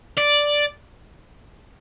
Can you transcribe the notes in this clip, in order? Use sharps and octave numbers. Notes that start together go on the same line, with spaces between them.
D5